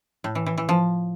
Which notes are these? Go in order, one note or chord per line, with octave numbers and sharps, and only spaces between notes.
A2
E3
E3
E3
F3